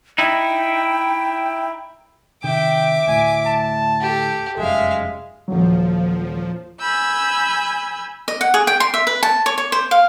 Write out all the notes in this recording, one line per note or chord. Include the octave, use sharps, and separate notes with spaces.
D#4 E4 G5
C3 D#3 E5 G5 D6
D2 A2 G#5
A5
G4 A4
F1 F#2 G#3 E5 F5
D#1 F3 F#3
G#5 B5 E6 G6
D#5
F#5
G#4
G5
C6
E5
B4
A5
C#5
C#5
C5
F5